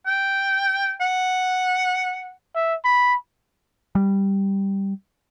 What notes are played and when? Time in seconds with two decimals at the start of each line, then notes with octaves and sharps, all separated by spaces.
0.06 G5
1.01 F#5
2.55 E5
2.85 B5
3.95 G3